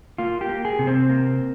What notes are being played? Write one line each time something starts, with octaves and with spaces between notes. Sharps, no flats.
A#3 F4
G4
A#3
G#4
C3
C4
A#3